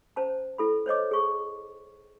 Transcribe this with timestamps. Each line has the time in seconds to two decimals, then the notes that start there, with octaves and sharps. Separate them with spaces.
0.16 C#4 C5 A5 A#5
0.58 E4 A4 B5
0.86 C5 C#5 D#5 D6
1.11 G#4 C#6